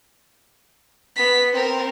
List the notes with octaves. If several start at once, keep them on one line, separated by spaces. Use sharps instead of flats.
B3 B6
C4 A#4